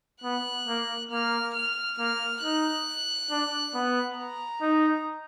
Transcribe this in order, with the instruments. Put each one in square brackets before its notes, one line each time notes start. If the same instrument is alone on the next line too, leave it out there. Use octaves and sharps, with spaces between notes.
[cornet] B3 [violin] F#6
[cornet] A#3
[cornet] A#3 [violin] F6
[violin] F6
[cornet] A#3 [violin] F6
[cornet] D#4 [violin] F#6
[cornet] D4
B3
[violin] A#5
[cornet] D#4